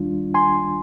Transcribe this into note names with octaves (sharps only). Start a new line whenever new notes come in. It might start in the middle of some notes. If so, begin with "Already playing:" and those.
Already playing: D#2 D#3 G3 D4 F4
G#5 C6